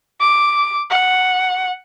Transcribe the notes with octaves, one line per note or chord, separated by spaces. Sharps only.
D6
F#5